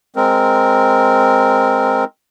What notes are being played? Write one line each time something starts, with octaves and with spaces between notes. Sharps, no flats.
G#3 C4 A#4